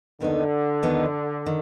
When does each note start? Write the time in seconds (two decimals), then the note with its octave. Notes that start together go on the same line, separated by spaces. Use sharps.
0.20 D#2 D3 D#3 B3 D#4
0.83 D#2 D#3 B3 D#4
1.46 D#3